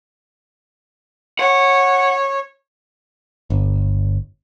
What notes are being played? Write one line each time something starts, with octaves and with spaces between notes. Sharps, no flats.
C#5 F#5
G1